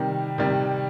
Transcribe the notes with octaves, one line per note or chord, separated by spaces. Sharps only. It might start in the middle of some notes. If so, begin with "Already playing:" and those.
Already playing: C3 D#3 G3
C3 D#3 G3